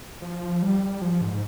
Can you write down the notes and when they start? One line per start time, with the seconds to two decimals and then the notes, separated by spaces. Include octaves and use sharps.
0.22 F3
0.62 G3
1.02 F3
1.21 G#2